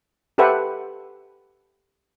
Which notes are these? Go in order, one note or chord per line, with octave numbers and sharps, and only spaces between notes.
G4 A4 B4 C5 E5 F#5